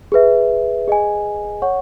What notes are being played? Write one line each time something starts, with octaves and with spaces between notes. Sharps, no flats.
G#4 B4 E5
G#4 D#5 G#5
C#5 F#5 C#6